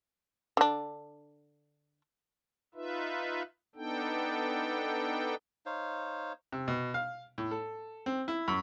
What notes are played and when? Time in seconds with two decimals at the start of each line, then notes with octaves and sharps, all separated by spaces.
0.57 D3 D4
2.75 D#4 F4 B4 E5
3.76 B3 D4 D#4 A4 G5
5.66 D#4 C5 C#5 F5
6.52 C3
6.68 B2
6.94 F5
7.38 A2
7.51 A4
8.06 C4
8.28 E4
8.48 F#2